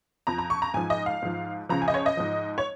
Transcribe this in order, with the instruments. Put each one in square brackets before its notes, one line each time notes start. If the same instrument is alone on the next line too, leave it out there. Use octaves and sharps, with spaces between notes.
[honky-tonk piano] F2 F3 A#5
A#5
C#6
A#5
G#2 F3 G#5
D#5
F5
G#2 F3
C#2 C#3 F3 A#5
G#5
D#5
C#5
D#5
G#2 F3
C#5